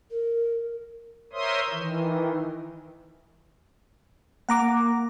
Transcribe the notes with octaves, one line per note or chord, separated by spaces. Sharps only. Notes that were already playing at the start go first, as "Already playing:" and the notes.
A#4
A#4 C5 C#5 E5 C6 D#6
D#3 E3
A#3 F#5 A#5 D6